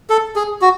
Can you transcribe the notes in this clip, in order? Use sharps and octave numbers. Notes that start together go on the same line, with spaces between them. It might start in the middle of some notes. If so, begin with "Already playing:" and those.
A4
G#4
F#4